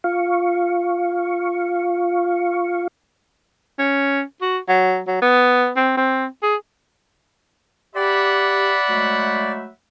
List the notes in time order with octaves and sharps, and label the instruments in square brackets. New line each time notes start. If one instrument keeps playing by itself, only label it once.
[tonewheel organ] F4 F5 C#6
[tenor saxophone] C#4
F#4
F#3
F#3
B3
C4
C4
G#4
[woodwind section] G4 [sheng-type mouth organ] D5 [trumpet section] E5 F#5 B5
[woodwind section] F#3 G#3 A3